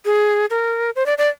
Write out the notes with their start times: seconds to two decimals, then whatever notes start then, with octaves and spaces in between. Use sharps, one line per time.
0.05 G#4
0.50 A#4
0.96 C5
1.06 D5
1.18 D5